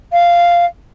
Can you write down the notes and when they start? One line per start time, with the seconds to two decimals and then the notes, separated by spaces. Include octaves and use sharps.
0.12 F5